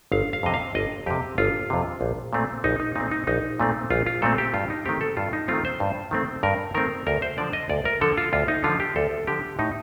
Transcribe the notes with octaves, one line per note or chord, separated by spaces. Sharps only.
G1 F5
F5
F2 C3 D#5
F5
G1 D#5
F2 C3 G4
G1 F4
F2 C3
A#1
A#2 A3 C4
A#1 D#4
D#4
A#2 A3 C4 D#4
D#4
A#1 D#4
A#2 A3 C4
A#1 F4
F4
A#2 A3 C4 A4
G4
G2 F4
D#4
D#3 A3 C4 G4
A4
G2 F4
D#4
D#3 A3 C4 F4
C5
G2
D#3 A3 C4
G2 A#4
D#3 A3 C4 A#4
D2 A#4
C5
D3 F3 D5
D#5
D2 D5
A#4
D3 F3 A4
F4
D2 F4
D#4
D3 F3 F4
G4
D2 A4
D3 F3 G4
A2 D#4